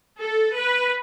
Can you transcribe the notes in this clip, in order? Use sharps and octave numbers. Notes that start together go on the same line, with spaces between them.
A4
B4